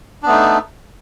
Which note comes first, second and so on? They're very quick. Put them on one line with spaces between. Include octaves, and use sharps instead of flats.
D4 B3 A3 D#4